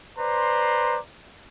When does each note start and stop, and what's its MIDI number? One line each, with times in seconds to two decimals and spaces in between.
0.18 0.98 71
0.18 0.98 72
0.18 0.98 74
0.18 0.98 82
0.18 0.98 84